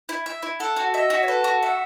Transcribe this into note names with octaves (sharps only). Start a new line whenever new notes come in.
E4
E5
E4
A4 F#5
F#4
D#5 E5
F#4
C#5
A4 B4
F#4
E5 F#5